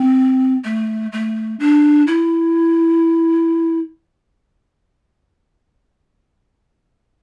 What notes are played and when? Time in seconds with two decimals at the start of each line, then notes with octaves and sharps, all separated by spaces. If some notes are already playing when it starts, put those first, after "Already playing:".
Already playing: C4
0.64 A3
1.12 A3
1.60 D4
2.07 E4